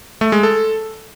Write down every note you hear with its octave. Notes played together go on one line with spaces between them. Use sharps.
A3
G#3
A4